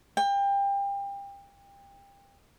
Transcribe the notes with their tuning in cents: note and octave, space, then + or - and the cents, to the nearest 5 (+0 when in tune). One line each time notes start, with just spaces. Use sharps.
G5 +30